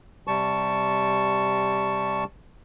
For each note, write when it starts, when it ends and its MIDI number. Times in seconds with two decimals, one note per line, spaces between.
0.27 2.24 48
0.27 2.24 55
0.27 2.24 81
0.27 2.24 85